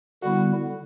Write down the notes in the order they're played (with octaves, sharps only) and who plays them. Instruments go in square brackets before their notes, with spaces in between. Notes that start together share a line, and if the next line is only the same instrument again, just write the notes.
[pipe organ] D3 G3 B3 E4 [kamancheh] F#4